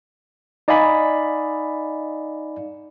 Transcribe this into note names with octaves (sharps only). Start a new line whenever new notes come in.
D#4 D5 D#5 F5 G#5 B5